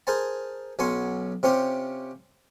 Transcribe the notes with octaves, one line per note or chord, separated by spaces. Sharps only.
G#4 A#4 C5 G#5 A5
B1 F#3 C#4 G#5 C6 C#6
C3 C4 C#4 F4 G4 C6